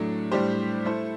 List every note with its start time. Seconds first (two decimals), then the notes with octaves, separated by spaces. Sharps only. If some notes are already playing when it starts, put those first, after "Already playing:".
Already playing: A2 F#3 A3 D4
0.32 A2 G3 D4 G4 C5
0.85 A3 E4 A4 C5